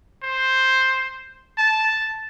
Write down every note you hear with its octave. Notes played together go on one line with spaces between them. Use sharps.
C5
A5